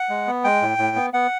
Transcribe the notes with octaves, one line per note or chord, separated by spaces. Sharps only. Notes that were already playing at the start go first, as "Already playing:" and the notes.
Already playing: F#5
G#3
B3
G#3 G5
A2
A2
B3
B3 F#5